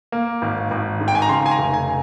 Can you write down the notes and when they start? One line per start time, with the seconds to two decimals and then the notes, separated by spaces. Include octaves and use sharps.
0.12 A#3
0.42 G#1
0.71 G#1
1.00 G#2
1.08 G5
1.15 G#5
1.22 A#5
1.29 C#3 C6
1.46 G#5
1.51 A#5
1.58 F1
1.74 G#5